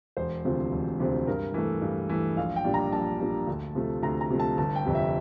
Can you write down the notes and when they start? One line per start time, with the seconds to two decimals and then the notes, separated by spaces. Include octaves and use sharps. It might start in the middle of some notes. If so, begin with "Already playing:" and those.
0.17 E1 C5
0.45 D2 C3 F3 C4
0.72 E1
1.00 D2 C3 F3 C4
1.27 G2 A#4
1.54 E3 A3
1.82 G2
2.09 E3 A3
2.37 A#1 F5
2.56 G5
2.64 A#2 G3 D4
2.74 A#5
2.92 A#1 A5
3.20 A#2 G3 D4
3.47 D2
3.75 C3 F3 A3
4.02 D2 A#5
4.21 A#5
4.30 C3 F3 A3
4.40 A5
4.58 G1 A5
4.76 G5
4.86 F2 C3
4.95 E5